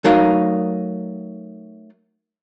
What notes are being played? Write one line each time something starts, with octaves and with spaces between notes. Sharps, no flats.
F#3 A3 D#4 A#4 F5